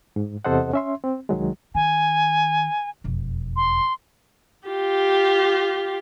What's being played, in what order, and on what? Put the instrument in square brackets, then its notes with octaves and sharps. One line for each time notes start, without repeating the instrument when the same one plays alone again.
[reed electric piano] G#2
E2 C3 A4 C5 D#5 F#5
C#4 E5 C6
C4
C2 D#3 F#3 G#3
[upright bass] D#3 [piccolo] G#5
[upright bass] E1 F2
[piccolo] C6
[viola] F4 G4